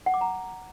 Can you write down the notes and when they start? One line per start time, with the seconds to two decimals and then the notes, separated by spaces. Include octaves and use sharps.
0.06 F#5
0.14 D6
0.21 A#5